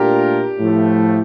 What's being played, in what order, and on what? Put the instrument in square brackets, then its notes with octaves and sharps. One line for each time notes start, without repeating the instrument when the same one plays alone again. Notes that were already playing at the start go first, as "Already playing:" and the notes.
Already playing: [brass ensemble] A#2 A3 D4 F4 A#4 [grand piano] G4
[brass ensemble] A2 F3 A3